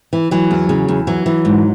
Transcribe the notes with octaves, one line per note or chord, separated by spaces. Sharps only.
E3
E3 F#3
E2
C#3
E2
E3 F#3
E3
G#2